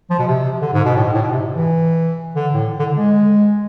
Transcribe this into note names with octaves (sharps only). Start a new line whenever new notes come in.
F3
B2
C3
D3
G#2
B2
A2
G#2
A2
B2
C3
E3
D3
A2
D3
G#3